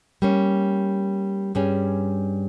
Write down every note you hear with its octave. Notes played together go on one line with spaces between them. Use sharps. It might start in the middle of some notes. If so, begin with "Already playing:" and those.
G3 A#3 C#4
G2 G3 C#4 G#4